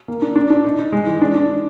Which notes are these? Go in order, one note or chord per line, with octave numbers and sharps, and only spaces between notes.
A#3
D4
D4
D4
D#4
D#4
G#3
E3
D4
D4